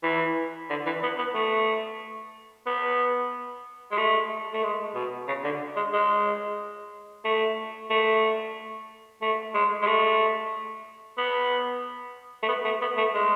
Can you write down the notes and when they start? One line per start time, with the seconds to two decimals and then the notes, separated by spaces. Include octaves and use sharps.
0.03 E3
0.70 D3
0.86 E3
1.03 B3
1.18 B3
1.34 A3
2.66 B3
3.91 G#3
3.98 A3
4.53 A3
4.63 G#3
4.95 B2
5.28 C#3
5.44 D3
5.77 G#3
5.93 G#3
7.25 A3
7.90 A3
9.22 A3
9.54 G#3
9.82 G#3
9.87 A3
11.18 B3
12.43 A3
12.48 B3
12.65 A3
12.81 B3
12.97 A3
13.14 G#3